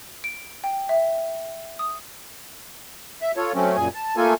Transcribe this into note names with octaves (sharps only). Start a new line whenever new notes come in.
D7
G5
E5
D#6
E5
F4 A4 C#5
F#3 A3 C4 C#4
F#2 A#2 G#4 G#5
A5
A3 A#3 F4 A4 G#5